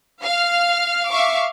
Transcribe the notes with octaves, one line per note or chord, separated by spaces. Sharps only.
F5 F6
E5 F5 C#6 D6